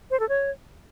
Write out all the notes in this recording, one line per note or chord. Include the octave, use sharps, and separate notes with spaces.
C5
A4
C#5